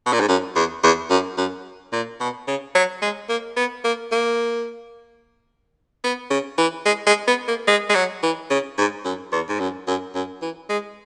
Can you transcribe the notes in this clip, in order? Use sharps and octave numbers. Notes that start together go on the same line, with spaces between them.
B2
A#2
G#2
F#2
E2
E2
F#2
F#2
A#2
B2
C#3
F#3
G#3
A#3
B3
A#3
A#3
B3
C#3
E3
G#3
G#3
B3
A#3
G#3
G#3
F#3
E3
C#3
G#2
F#2
E2
G#2
F#2
F#2
F#2
E3
G#3